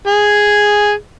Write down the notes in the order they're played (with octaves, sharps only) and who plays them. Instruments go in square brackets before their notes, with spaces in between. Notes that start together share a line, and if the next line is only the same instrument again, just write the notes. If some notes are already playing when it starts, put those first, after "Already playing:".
[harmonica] G#4